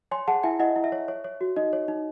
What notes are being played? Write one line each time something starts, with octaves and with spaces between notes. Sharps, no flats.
C#5 G#5 C6
G#4 F#5 A5
E4 E5 G#5
E4 D#5 F#5
E4
E5
C#5
C#5
C#5
F#4
D#4 D#5
C#5
D#4